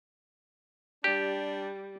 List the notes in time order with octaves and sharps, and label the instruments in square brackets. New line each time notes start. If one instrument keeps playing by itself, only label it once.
[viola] G3 [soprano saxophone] D4 [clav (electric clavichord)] G4